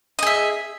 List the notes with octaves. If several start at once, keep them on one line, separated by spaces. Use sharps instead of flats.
G#4 D#5 E5